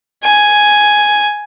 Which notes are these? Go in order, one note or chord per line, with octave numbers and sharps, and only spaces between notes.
G#5